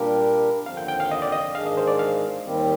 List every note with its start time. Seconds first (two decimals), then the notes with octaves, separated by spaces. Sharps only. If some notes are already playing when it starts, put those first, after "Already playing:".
Already playing: A#2 G3 D4 G4 A#4 F5
0.66 D#2 D3 F3 C4 F5
0.77 G5
0.88 G5
1.00 F5
1.11 D#5
1.22 D5
1.32 D#5
1.55 G#2 D#3 G#3 D4 G#4 F5
1.66 D#5
1.77 C5
1.87 D5
1.99 F5
2.43 D#2 D#3 G3 C4 G4